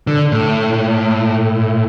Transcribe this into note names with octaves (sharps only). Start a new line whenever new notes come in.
D3
A2